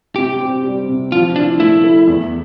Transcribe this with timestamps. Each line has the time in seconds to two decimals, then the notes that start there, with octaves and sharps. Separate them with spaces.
0.16 C3 G4
0.40 C4
0.64 G3
0.88 C3
1.12 F3 F4
1.36 D4 E4
1.60 A3 E4
1.84 A4
2.07 E2